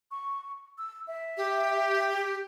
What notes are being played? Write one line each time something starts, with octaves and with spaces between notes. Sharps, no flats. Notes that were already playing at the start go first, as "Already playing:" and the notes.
C#6
E6
E5
G4